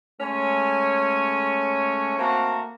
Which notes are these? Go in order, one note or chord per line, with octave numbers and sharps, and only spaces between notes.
G#3 A3 C#4 C#5 G#5
A3 A#3 C4 F#4 A#5